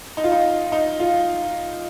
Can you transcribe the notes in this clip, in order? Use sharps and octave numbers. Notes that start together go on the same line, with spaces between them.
D#4
F4
D#4
D#4
F4